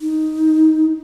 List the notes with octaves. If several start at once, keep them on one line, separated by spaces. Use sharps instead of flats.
D#4